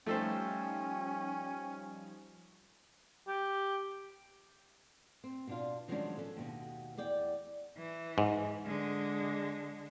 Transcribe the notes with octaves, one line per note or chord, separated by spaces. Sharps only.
F3 G3 A3 C#4 D#4 A4 C5 G5
G4
C4
B2 D4 F4
D#3 F3 F#3 G#3 C#4 D4
C#4 D4 A4
D#2 B2 F#4
E2 G#4 D5 G5
E3
G#2
D3 G#3